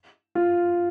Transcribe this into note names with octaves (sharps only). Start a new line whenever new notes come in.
F4